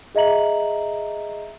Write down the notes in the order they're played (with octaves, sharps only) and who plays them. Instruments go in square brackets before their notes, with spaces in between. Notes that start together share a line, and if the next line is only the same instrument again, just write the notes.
[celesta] G#4 D#5 E5 A#5 F#7